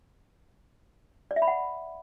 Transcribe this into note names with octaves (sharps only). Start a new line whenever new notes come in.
D5
E5
B5
F#5